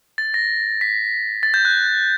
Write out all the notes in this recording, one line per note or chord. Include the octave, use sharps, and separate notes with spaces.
A6
A#6
B6
A6
G6
F#6